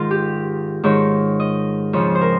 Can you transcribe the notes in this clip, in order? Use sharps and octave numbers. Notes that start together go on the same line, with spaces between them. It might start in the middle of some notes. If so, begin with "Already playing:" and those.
Already playing: G#2 D#3 F4
G4
G#2 D#3 C#5
D#5
F2 C#3 F3 C#5
C5
A#4